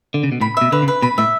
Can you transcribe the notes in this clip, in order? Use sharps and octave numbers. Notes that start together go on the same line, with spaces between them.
D3
C#3
B2
A2 B5
B2 E5
D3 B4
C#3
B4
B2 B5
A2 E5